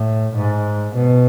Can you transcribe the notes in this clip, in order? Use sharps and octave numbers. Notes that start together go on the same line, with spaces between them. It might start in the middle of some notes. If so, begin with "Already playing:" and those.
Already playing: A2
G#2
B2